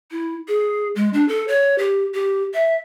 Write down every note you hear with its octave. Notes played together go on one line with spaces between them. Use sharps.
E4
G#4
G#3
D4
A4
C#5
G4
G4
E5